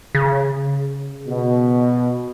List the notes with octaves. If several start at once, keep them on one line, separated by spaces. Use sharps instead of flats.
C#3
B2